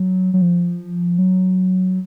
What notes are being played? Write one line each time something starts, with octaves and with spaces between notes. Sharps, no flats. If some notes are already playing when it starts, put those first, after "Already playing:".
Already playing: F#3
F#3
F3
F#3